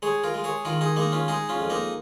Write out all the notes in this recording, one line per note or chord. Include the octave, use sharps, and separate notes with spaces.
G#3 G#4 C#5
F4 A#4
G#3
G#4 C#5
D#3 F4 A#4
D#4 G#4
G#3 A#3 D#4
C#4 F4
G#3 D#4 G#4
C#4 F4
F2
A#3 D#4